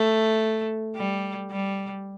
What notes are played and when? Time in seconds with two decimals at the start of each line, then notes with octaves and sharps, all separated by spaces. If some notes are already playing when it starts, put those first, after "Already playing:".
Already playing: A3
0.96 G3
1.51 G3